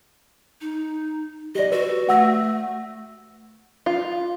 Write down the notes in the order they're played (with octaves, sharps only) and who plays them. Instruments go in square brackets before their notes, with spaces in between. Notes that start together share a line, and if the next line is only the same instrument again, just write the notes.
[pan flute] D#4
[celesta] G4 D5 [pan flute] D#5
[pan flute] F#4 [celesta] B4
[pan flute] A3 [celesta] F#5 E6 A#6
[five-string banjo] F4